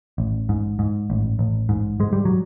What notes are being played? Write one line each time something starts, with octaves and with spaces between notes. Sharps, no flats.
A1
G#2
G#2
A1
A1
G#2
G#2 G#3
G3
F#3